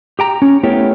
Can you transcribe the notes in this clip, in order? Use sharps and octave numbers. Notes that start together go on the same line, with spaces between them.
G4 G5 A#5
C#4
A3 B3 E4 G4 A#4 C#5